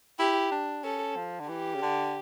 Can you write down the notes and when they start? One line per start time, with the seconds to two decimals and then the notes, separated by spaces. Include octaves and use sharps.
0.19 E4 G4
0.51 D4
0.84 C#4 A4
1.16 F3
1.40 D3
1.49 E3 G4
1.75 C#3
1.82 D3